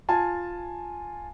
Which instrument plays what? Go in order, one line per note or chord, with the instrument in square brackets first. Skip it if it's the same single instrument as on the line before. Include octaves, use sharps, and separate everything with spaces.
[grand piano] F4 G#5 A5